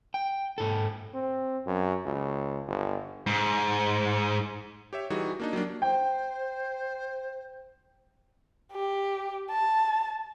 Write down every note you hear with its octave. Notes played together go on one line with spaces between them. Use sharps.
G5
G#2 A4
C4
F#2
C#2
G1
G#2
G4 C#5 E5
E3 G3 D#4 F#4 G#4
A#3 D4 D#4
F#3 G3 A#3 D4
C5 G5
G4
A5